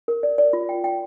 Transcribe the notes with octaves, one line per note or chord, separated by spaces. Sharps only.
A#4
D5
D5
F4
G5
G5